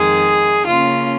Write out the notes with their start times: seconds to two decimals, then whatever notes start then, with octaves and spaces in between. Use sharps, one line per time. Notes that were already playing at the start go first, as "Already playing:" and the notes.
Already playing: F2 D#3 G#3 G#4
0.66 C#3 A#3 C#4 F4